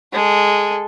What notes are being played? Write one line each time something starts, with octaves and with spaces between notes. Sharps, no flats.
G#3 A4